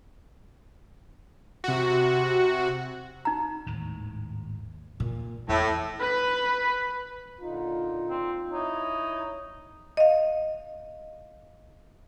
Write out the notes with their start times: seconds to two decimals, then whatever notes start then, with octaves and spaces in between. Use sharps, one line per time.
1.64 C3 F#4
3.25 D#4 A#5
3.67 G#1 D#2 A2
5.00 A#2
5.49 E2 A2
6.00 B4 B5
7.41 A#2 D3 D#4 F4
8.09 C4
8.52 D#4 E4 C#5
9.97 D#5 F5